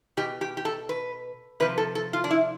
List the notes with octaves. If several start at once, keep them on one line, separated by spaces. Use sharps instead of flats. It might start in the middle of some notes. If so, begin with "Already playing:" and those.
B2 G4
G4
G4
A4
B4
C3 F3 B4
A4
A4
F4
D4
E4